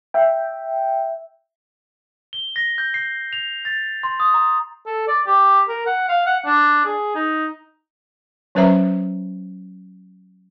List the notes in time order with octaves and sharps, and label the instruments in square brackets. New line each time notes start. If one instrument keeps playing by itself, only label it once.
[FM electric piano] E5 G5
[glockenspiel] G7
A#6
G6
C7
F7
A6
C6
D#6
A#5
[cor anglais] A4
D5
G4
A#4
F#5
F5
F#5
D4
G#4
D#4
[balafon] F#3 C#4 B4 C5 E5 A#5